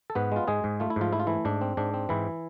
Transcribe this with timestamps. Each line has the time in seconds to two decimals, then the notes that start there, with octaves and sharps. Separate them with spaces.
0.10 A4
0.15 G#2 B3 B4
0.32 G#3 F4
0.48 G#2 G#3 G#4
0.64 G#2
0.80 A3 F4
0.90 E4
0.96 G#2 F3 F4
1.13 A3 E4
1.20 F4
1.27 E3 A3 E4
1.45 G#2 D4
1.61 C4
1.77 G#2 D4
1.94 C4
2.09 G#2 E3 E4